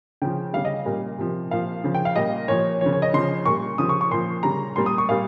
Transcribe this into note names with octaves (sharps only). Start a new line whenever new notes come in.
C#3 F3 G5
C#3 G3 F5
D#5
A#2 G3
C3 F3
A#2 F3 F5
C#3 F3
G5
F5
A#2 G3 D#5
A#2 F3 C#5
C#3 F3 C#5
C#5
D#5
C#3 F3 C6
A#2 G3 C#6
C#3 F3 D#6
C#6
C#6
A#2 F3 C6
C#3 G3 A#5
A#2 G3 C6
D#6
C#6
A#2 G3 F5